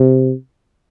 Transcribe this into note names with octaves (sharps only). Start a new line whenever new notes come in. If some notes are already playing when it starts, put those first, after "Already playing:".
Already playing: C3